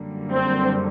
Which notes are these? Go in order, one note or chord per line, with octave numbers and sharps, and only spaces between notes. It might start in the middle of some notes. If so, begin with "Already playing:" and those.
Already playing: F#2 D3 G3 A#3
C4